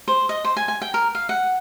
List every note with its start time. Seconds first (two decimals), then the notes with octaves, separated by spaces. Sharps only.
0.08 C5
0.29 D#5
0.44 C5
0.57 G#5
0.68 G#5
0.82 G5
0.94 A#4
1.15 F5
1.29 F#5